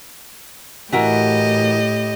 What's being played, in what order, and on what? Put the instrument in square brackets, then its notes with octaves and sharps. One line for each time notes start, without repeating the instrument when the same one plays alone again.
[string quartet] A2 G4 D#5 [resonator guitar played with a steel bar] E3 F#4 A#4